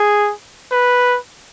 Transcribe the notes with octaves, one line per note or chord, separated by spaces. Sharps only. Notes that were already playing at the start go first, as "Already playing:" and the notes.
Already playing: G#4
B4